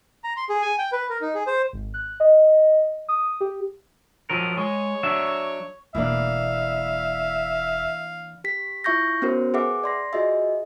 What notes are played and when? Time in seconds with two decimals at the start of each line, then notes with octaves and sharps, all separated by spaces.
0.24 A#5
0.37 C6
0.49 G#4
0.62 G#5
0.78 G5
0.92 B4
1.10 A#4
1.21 D#4
1.35 G#4
1.47 C5
1.73 G#1
1.94 F#6
2.20 D#5
3.09 D#6
3.41 G4
4.30 F3 F#3 A#4
4.57 G#3 C#5
5.03 F#3 D4 E5
5.95 E1 E3 A#3 D4 E5 F5
8.44 G4 B6
8.84 E4 F4 E5 C#6 G6 A#6
9.22 B3 C#4 F#4 A#4 C5
9.54 G#4 B4 E5 F#5 D6
9.84 D5 C6 A#6
10.13 F4 F#4 G#4 D#5 E5